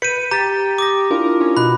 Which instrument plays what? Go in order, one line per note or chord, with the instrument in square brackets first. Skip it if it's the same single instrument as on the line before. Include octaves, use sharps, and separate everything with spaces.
[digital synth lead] B4 [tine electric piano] G6 B6 [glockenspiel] C#7 D#7
[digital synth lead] G4 [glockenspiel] A#5 [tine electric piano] G6 A6
[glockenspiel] D6 D#6 A#6
[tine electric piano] D4 E4 F4 [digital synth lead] A#4
[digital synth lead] C#4
[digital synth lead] B2 [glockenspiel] B5 F#6